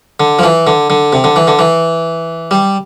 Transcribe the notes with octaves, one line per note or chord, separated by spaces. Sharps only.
D3
F3
E3
D3
D3
C3
D3
E3
D3
E3
G3